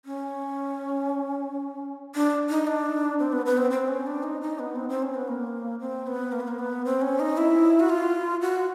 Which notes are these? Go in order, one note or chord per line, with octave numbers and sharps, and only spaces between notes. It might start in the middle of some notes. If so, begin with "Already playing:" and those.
C#4
D4
D#4
D4
C4
B3
B3
C4
C4
C#4
D4
D#4
D#4
B3
C4
C4
C#4
B3
A#3
C4
B3
A#3
B3
A#3
B3
C4
C#4
D#4
E4
F#4
F4
F#4